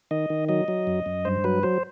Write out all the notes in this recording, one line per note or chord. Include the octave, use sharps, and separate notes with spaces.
D#3 D#5
D#3
F#3 D#5
F#3
F#2
F#2
G2 C5
F#3 B4
F#3 C5